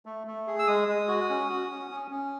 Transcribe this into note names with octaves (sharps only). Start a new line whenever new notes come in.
A3
A3
G#4
E6
G#3 D#6
G#3
F#4
C#4
F#4
C#4
C#4
C#4